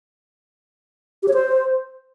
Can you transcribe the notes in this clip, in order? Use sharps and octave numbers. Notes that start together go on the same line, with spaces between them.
G4
C#5
C5